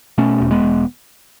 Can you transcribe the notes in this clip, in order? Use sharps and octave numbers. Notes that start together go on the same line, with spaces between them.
B2 A3 C#4
E1
G#3 B3
E1